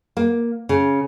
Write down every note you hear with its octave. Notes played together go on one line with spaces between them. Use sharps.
A#3
C#3